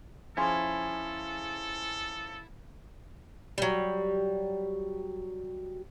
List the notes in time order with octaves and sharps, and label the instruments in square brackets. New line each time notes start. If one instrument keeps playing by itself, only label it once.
[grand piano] F3 C#4 G#4 [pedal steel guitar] E4 [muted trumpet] A4 [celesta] C5 G#5 C6
[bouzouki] F#3 G3